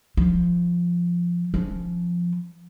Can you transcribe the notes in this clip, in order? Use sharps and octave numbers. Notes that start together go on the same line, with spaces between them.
F3
F3 C#4